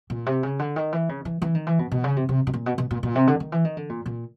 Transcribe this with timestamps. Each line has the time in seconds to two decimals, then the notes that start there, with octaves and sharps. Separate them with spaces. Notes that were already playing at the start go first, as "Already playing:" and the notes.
0.10 A#2
0.26 C3
0.43 C#3
0.59 D3
0.76 D#3
0.93 E3
1.09 C#3
1.25 E3
1.42 E3
1.55 D#3
1.67 E3
1.79 B2
1.92 B2
2.04 C#3
2.16 C3
2.29 C3
2.47 B2
2.54 A#2
2.66 B2
2.78 B2
2.91 A#2
3.03 A#2
3.15 C3
3.27 D3
3.40 D#3
3.52 E3
3.65 D#3
3.77 D3
3.89 A#2
4.06 A#2